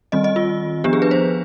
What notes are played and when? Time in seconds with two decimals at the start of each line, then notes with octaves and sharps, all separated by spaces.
0.12 D#3 G3 C4 D#5
0.24 D#5
0.36 F4
0.84 F3 B3 D4 G4
0.93 G#4
1.02 B4
1.11 C5